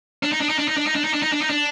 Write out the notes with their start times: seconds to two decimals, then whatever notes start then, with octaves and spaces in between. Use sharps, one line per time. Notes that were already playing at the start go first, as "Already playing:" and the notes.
0.23 D4
0.32 D#4
0.41 D4
0.49 D#4
0.59 D4
0.68 D#4
0.77 D4
0.86 D#4
0.95 D4
1.04 D#4
1.14 D4
1.22 D#4
1.32 D4
1.41 D#4
1.50 D4